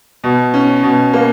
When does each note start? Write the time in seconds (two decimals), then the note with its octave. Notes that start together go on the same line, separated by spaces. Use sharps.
0.24 B2
0.54 C#4
0.83 B2
1.13 A#3